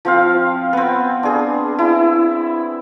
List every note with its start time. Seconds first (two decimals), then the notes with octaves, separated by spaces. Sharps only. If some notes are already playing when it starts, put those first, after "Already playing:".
0.05 F3 C4 F5
0.73 B3 C4
1.23 D4 G#4
1.79 E4